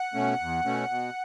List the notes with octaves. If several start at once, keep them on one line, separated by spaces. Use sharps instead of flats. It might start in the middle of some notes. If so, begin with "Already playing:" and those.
Already playing: F#5
B2 A3 C#4
E2
B2 A3 C#4
B2